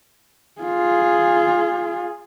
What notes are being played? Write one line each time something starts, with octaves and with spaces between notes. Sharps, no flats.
F4 G#4